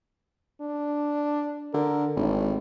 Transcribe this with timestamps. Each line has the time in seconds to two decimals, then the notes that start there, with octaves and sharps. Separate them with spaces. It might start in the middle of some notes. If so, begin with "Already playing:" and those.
0.61 D4
1.74 D3 A#4
2.17 G#1 A2